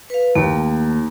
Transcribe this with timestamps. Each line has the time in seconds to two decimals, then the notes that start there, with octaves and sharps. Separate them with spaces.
0.10 B4 F5
0.35 D#2 A3 A#3